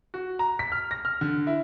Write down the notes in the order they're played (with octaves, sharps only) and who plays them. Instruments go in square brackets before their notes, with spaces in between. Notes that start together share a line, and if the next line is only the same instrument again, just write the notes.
[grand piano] F#4
A#5
B6
F6
A#6
F6
D3
E4